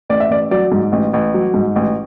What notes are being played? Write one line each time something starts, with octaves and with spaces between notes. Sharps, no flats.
A1 D5
E5
A1 D5
F#3 D5
G#2
A1
A1
F#3
G#2
A1